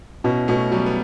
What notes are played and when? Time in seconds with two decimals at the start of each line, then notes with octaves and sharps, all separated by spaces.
0.24 B2 C#4 E4
0.48 B2 A3 C#4
0.71 F#3 G3 B3
0.86 B3